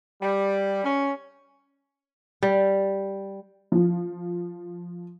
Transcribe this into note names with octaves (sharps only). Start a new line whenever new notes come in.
G3
C#4
G3
F3